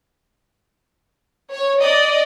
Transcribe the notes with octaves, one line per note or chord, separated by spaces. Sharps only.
C#5
D5 D#5